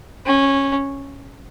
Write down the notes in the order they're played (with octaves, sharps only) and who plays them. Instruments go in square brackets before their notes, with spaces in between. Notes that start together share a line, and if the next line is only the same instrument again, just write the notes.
[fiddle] C#4